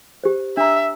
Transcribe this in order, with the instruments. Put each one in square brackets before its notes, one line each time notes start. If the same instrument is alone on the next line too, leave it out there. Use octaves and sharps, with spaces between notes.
[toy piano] G4 C5
[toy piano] D4 A#5 [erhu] E5